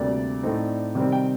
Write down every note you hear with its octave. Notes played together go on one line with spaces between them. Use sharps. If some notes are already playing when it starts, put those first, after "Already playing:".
Already playing: D2 C3 G3 A#3 D4 D5
A2 A3 C4 D#4
C3 D#3 G3 C4
G5